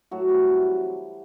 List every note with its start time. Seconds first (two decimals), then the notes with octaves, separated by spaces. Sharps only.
0.11 A2 F#3 F#4
0.29 E3 G3
0.47 C3